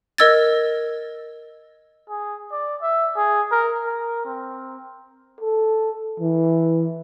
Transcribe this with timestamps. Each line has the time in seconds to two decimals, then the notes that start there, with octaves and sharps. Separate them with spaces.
0.18 A#4 D#5 E6 G#6 A6
2.09 G#4
2.52 D5
2.82 E5
3.16 G#4
3.52 A#4
3.84 A#4
4.25 C4
5.41 A4
6.20 E3